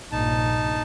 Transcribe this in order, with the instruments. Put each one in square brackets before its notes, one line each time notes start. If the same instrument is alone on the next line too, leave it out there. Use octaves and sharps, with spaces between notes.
[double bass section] A#1 G2 C3 [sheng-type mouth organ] D#4 A5